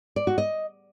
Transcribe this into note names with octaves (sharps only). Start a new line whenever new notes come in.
D5
F#4
D#5